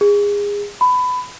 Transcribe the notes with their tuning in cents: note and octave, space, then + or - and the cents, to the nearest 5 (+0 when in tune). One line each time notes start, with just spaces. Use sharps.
G#4 -25
B5 +20